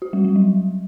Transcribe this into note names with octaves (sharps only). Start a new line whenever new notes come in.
F#4
G3
G3
F#3